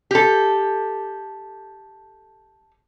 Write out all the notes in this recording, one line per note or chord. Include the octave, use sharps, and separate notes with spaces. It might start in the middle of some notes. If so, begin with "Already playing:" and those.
G4 A4